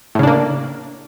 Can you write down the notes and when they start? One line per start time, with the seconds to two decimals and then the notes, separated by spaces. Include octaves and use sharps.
0.15 A2
0.19 C#3
0.23 D4
0.27 A#3